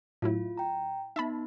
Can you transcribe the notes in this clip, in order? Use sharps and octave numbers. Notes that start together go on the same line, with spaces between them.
A2 F#3 E4 F4
G5 A#5
B3 D#4 E5 A5 B5